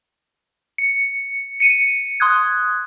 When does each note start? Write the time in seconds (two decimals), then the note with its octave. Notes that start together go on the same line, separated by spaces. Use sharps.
0.78 C#7
1.60 C#7 D#7
2.20 C6 D#6 F#6 G#6